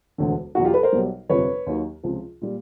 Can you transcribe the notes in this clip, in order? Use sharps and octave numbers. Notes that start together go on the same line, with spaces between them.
E1 D2 D3
E2 B2 F#3 F#4
F4 G4
A4 B4
A#4 C5
B1 B2 G3
G1 F2 C3 F3 B4 C#5
D#2 D#3 F#3
C#2 C3 F3
A#2 G3